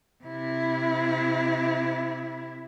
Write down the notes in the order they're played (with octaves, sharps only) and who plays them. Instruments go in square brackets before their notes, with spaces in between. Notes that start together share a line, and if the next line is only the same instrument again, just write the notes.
[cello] C3 E4